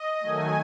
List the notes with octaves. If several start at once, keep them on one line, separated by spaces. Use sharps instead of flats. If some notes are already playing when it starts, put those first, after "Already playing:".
Already playing: D#5
D#3 F#3 A3 G#5